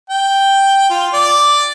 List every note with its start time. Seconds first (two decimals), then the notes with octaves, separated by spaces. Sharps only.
0.10 G5
0.91 F4
1.13 D5